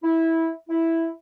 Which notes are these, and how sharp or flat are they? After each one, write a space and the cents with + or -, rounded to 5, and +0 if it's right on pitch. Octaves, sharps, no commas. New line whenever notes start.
E4 -15
E4 -5